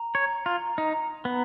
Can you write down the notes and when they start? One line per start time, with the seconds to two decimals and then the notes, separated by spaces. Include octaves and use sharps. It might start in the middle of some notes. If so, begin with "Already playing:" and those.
Already playing: A#5
0.15 C#5
0.46 F4
0.78 D#4
1.25 B3